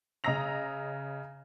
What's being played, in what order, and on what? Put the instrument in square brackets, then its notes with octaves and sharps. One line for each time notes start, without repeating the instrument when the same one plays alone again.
[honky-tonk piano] C#3 D#5 A#5 E6 A#6 F7